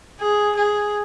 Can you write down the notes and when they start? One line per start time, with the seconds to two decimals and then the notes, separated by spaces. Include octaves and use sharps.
0.20 G#4
0.56 G#4